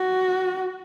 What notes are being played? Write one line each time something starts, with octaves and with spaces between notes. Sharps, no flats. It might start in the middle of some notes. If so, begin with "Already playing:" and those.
Already playing: F#4